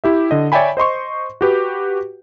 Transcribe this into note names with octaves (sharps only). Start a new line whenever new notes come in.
E4 G4 E5
D3 D#5
C#5 D5 E5 G5 G#5 B5
C5 D#5 C6 C#6
F#4 G4 B4